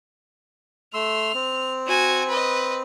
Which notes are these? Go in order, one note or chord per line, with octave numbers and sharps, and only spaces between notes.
A3 C6 E6 F6
C4
F#4 G#5
B4 D#5